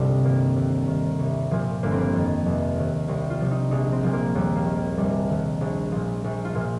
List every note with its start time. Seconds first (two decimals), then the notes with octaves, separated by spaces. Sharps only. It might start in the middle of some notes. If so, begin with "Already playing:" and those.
Already playing: G1 C2 C3 G3 C4 D#4 F4
0.24 G2 D#3 A#3
0.56 D#2
0.88 D#3
1.19 C2
1.51 A#2 F3
1.83 G1 A#3
1.91 C4
2.01 A#3
2.13 F2 D#3
2.46 F1
2.77 D#2 D#3
3.08 C2 C4
3.30 F4
3.41 C3 F3
3.51 D#4
3.71 A#1 D#4
3.92 C4
4.03 A#2 F3
4.13 A#3
4.35 D#2 G3
4.56 A#3
4.66 D#3
4.77 A#3
4.98 F1 G3
5.29 D#2 D#3
5.61 A#1
5.92 A#2 F3
6.24 A#1
6.45 F4
6.55 A#2 F3